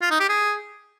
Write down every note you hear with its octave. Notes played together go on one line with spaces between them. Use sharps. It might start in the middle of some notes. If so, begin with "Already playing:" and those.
F4
D#4
G4
G#4